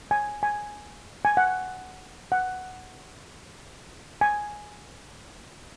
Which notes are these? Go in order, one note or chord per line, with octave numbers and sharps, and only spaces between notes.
G#5
G#5
G#5
F#5
F#5
G#5